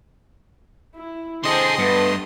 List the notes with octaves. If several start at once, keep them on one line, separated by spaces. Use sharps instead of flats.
E4
D3 G#4 C5 D#5 G5 A5 C6
G2 G3 A3 B3